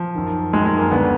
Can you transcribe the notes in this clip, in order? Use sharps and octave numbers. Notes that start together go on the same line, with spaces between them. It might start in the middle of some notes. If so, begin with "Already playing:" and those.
Already playing: F3
F#2 D#3
F#2 D#3 G#3
G#3
A#3
D2 D3 B3